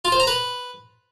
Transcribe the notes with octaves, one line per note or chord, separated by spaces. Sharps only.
F4
C5
A#5
B4